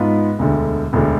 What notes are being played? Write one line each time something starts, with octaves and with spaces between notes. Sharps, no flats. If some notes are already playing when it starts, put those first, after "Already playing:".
Already playing: G#2 G#3 B3 F4 B4
E1 D2 D3
E1 D2 D3